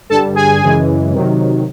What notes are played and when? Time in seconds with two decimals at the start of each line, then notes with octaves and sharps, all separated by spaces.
0.09 G2 D3 G3 A4 A5
0.35 G#4 G#5
0.61 F#2 C#3 E3 G#3
1.12 C3 D#3 F#3